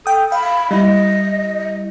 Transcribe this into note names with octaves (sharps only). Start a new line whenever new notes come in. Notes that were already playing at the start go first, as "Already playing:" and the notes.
A4 G5 D#6
F5 B5
G3 E4 D#5